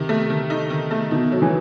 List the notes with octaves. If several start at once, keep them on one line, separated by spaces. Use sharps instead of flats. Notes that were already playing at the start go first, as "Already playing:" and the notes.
Already playing: C3 D#3
A3
D#3
D#4
D#3
A3
B2 D#3
F#3
E3